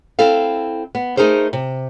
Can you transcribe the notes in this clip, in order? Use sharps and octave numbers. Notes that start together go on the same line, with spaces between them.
C4 E4 A4 F5
B3
A3 D#4 G#4 A#4 C5
C3